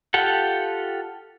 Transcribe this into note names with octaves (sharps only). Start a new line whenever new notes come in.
F4 G4 A4 F#5